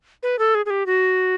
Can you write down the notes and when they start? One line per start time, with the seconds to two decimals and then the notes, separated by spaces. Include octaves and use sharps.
0.23 B4
0.39 A4
0.55 G#4
0.66 G#4
0.70 G4
0.86 F#4